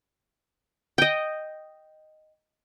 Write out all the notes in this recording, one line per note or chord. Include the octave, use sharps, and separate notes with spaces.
D#5 G5